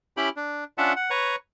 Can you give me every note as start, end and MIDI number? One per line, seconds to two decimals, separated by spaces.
0.17 0.29 61
0.17 0.29 64
0.17 0.29 67
0.17 0.29 79
0.17 0.29 83
0.37 0.64 62
0.78 0.93 61
0.78 0.93 62
0.78 0.93 65
0.78 0.93 76
0.78 0.93 78
0.78 0.93 81
0.96 1.10 78
1.10 1.36 71
1.10 1.36 73
1.10 1.36 82
1.10 1.36 85